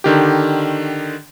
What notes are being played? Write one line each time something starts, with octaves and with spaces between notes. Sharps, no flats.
D3 D#3 G4